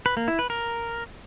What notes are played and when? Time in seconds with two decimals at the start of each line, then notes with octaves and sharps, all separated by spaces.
0.06 B4
0.17 A#3
0.28 E4
0.39 B4
0.50 A#4